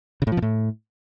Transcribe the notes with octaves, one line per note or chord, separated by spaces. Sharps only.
C#3
A2
F3
B2
A2